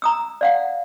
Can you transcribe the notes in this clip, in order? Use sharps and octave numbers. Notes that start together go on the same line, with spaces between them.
A#5 D#6 E6
D5 F5 F#5